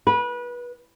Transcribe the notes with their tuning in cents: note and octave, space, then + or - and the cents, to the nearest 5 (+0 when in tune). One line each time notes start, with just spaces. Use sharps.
B4 -25